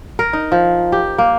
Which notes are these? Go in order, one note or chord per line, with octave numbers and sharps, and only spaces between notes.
A#4
D#4
F3
G4
A#3